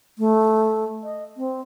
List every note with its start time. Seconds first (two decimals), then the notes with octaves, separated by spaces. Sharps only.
0.18 A3
1.03 D#5
1.37 C4